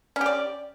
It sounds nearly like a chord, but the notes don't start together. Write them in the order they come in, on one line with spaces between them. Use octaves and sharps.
C#4 G4 D5